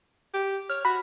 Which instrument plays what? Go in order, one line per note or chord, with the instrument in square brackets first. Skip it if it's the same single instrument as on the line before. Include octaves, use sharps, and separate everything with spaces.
[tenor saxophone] G4
[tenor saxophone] C#5 [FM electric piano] F6
[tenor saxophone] F#4 [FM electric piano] B5